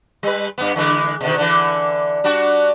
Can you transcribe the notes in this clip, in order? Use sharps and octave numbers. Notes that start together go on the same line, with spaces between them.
G3 B4
G2 B3
D3 E3 G#3
B2 D3 D#3
D3 E3
G3 D4 F#4